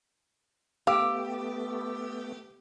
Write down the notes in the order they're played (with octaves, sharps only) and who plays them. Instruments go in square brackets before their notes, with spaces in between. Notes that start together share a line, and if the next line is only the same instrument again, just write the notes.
[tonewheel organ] A3 B3 [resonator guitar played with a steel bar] G4 [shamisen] F5 [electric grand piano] D6 E6